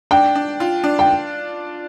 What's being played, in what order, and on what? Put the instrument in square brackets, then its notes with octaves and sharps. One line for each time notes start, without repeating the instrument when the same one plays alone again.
[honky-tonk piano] D4 [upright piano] G5
[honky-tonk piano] D4
F4
D4
[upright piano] G5